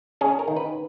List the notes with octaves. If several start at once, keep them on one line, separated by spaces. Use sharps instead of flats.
C#4 G#4
A#4
D#3
B4